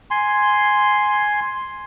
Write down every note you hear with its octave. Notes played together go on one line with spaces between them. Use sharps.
G#5 C6